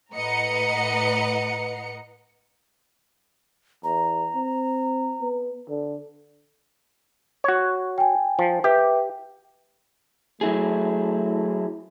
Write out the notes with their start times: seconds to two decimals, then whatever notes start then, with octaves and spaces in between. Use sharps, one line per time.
0.14 A2 B4 D#5 F#5 A#5 C#7
3.84 E2 A#5
4.35 C4
5.21 B3
5.69 D3
7.44 F#4 C#5
7.98 G5 G#5
8.39 F3
8.64 G4 B4 E5
10.41 F#3 A3 E4 G#4